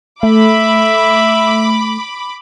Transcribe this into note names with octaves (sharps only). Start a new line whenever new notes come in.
A3 E5 B5 D6